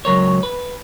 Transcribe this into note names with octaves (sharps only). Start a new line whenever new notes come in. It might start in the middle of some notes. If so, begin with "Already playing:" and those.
C#2 F#3 A#4 C#5
B4